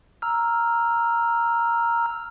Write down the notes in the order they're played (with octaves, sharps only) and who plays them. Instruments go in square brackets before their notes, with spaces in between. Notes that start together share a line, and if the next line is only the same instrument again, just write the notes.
[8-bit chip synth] A#5 E6 F6